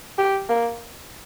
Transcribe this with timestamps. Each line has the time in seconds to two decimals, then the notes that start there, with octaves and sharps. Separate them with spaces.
0.18 G4
0.49 A#3